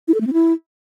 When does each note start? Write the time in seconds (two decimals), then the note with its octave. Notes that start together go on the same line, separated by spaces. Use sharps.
0.08 E4
0.14 A4
0.21 A3
0.27 C4
0.33 E4